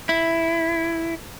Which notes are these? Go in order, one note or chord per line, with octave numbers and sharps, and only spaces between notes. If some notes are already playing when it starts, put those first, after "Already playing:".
E4